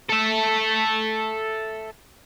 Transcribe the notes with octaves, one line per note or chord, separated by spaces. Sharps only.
A4 E5